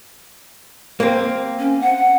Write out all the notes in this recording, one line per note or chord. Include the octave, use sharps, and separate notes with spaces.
A#3 C4
C#4
F#5